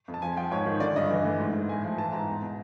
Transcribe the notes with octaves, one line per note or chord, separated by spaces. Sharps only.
F2
A5
F3 G#5
F3 G5
G#2 C#5
D#3
D3 D5
G2 D#5
E3
A2
G#2
G#2
A2 G#5
F3
E3 A5
G#2 A#5
E2
B2